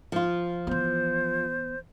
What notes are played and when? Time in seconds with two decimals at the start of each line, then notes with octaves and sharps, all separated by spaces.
0.12 F3 F4
0.67 E3 B3 C5